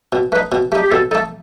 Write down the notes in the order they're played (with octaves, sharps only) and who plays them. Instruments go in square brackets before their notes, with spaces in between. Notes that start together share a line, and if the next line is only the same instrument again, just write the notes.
[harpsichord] B2
[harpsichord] A3 [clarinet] B4
[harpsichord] D#4
B2
[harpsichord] A3 D#4 [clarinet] G4
[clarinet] G4
[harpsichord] B2 [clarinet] A4
[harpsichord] A3 D#4 [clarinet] A4